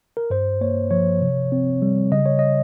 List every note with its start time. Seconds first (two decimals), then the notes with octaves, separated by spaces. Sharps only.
0.17 A#4
0.30 G2 C5
0.61 A#3 C#5
0.91 F3 C#5
1.21 C3
1.52 C4
1.82 G3
2.11 C#3 D#5
2.26 C#5
2.39 D#5